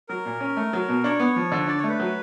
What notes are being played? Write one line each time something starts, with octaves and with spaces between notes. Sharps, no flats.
F#3 A#4
A#2
C#4
A3
F#3
B2
D4 C#5
B3
F3
D3
D4 D5
C#5
A3
B4
F#3